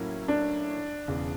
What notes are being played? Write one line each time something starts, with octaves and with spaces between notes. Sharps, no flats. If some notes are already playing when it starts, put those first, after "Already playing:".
Already playing: A2 F#3 A#3 C#4 E4
D4
E1 E2 C#3